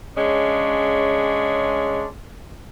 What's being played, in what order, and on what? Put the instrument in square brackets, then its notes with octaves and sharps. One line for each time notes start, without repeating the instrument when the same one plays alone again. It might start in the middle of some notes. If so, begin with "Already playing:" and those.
[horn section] C#3 G#3 C#4 D4